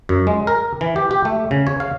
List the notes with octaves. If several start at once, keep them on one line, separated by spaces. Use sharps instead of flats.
F#2
G#3
A#4
E3
G4
G4
A3
C#3
C#5
F5